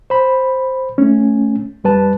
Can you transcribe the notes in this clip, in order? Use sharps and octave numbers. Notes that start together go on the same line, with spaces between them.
C5 B5
A3 C#4
F2 G3 B4 A5